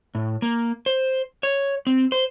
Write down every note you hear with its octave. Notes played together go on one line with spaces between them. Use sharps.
A2
A#3
C5
C#5
C4
C5